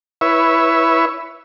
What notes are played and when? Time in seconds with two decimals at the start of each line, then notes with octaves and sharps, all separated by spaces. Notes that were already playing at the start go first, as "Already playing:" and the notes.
0.21 E4 B4 C#5 E5